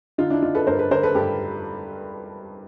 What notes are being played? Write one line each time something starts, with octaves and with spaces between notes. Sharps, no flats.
D3 D#4 F4
D4 E4
D3 D#4 F4
A4 B4
G2 A#4 C5
A4 B4
D3 A#4 C5
A4 B4
G2 G4 A4